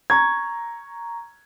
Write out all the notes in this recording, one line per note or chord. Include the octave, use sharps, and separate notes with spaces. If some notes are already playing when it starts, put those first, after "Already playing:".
A#5 C#6 G#6